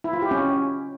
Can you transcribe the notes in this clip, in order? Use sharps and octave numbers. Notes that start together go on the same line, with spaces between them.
E4
F4
G4
C#4